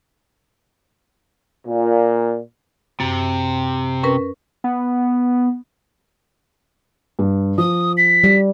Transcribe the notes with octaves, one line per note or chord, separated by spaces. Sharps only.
A#2
F#2 C3
C#4 A#4 B4
B3
G2
F3 D#6
B6
G3